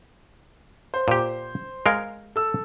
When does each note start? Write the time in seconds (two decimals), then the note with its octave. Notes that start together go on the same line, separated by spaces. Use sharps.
0.94 C5
1.08 A#2 G4
1.86 G#3 A#4 F5
2.36 A4 E6